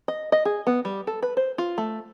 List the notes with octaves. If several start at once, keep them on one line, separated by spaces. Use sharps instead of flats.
D#5
D#5
G#4
B3
G3
A4
B4
C5
F4
A3